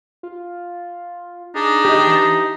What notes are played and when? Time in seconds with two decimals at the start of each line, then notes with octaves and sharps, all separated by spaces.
0.23 F4
1.55 D4 D#4 G#4
1.85 G4 D#5
2.07 E3